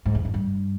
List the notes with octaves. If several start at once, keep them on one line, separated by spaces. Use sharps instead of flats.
G#2
E2
F2
G2